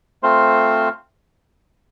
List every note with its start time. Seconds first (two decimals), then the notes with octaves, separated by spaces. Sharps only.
0.23 A3 C4 F4 C5